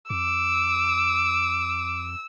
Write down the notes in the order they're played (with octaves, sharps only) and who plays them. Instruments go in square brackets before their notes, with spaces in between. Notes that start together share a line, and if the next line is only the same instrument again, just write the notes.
[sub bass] F2 [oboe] D6 [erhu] E6